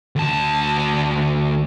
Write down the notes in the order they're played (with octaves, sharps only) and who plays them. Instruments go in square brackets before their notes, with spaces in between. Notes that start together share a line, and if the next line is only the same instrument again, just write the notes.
[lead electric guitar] D2 A5